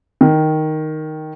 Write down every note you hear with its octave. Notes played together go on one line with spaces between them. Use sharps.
D#3